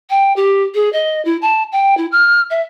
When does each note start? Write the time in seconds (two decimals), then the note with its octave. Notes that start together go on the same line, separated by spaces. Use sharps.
0.09 G5
0.36 G4
0.74 G#4
0.92 D#5
1.25 E4
1.41 A5
1.72 G5
1.97 E4
2.11 F6
2.50 E5